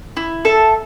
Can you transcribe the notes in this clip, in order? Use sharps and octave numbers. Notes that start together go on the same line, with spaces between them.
E4
A4 E5 A5